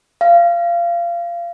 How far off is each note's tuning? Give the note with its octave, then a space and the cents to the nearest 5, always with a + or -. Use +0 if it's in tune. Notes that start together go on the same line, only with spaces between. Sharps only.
F5 -25